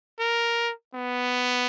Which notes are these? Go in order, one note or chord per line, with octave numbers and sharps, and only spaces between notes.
A#4
B3